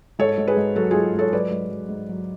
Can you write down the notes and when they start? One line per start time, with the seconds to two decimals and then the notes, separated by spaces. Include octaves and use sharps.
0.19 G#2 A4 C#5
0.38 G#2
0.47 G#4 B4
0.57 G#2
0.76 F#3 F#4 A4
0.91 F4 G#4
0.95 G#2
1.15 G#2 A4 C#5
1.33 F#3 B4 D5
1.52 G#2
1.71 F#3
1.89 G#2
2.09 F#3